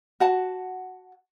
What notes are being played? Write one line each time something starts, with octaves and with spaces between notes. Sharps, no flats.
F#4 F#5 A5